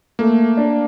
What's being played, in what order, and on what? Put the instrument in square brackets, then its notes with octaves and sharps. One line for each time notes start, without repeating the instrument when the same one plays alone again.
[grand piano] A3 [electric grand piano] A#3
[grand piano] D4